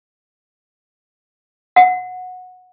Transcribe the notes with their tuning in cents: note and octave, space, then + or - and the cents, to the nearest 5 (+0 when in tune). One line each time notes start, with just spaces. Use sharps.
F#5 -15